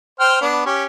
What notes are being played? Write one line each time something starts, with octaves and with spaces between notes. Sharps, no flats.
C5 G5 F6
B3 D4
C#4 G4